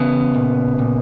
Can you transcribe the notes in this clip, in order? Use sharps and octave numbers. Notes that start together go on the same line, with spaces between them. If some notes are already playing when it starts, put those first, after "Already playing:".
Already playing: E2 C#3 B3
A#2
A#2